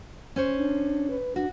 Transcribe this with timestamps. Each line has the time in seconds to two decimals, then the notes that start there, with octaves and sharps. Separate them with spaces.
0.36 C#4 C5 C#5
0.57 D4
1.10 B4
1.36 D4 F#4